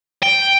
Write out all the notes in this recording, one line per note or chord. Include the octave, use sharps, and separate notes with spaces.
G5